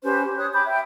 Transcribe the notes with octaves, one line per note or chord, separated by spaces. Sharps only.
C#4 G4 B4 C5
G4
C#5 D#6 F#6
G5 B5 D6 G6
E5 G5